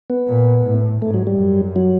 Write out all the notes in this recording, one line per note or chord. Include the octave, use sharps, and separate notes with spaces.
B3
A#2
A2
G#2 A3
F#3
G3
F#2
F#3